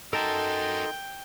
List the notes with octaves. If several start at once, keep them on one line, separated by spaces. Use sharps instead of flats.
D#4 F#4 A4 A#4 D#5 G5 A5 C6